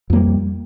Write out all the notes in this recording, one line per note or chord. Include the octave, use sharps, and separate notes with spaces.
F2 G3 A#3